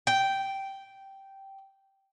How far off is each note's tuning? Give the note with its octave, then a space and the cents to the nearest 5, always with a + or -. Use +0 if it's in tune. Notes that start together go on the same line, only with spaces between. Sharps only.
G5 -10